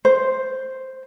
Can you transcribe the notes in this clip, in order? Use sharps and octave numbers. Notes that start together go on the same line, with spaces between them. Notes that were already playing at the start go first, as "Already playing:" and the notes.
C5